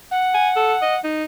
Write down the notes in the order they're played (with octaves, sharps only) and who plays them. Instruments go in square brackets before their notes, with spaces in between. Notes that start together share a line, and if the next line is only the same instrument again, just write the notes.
[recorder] F#5
[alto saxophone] G#5
A4
D#5
D#4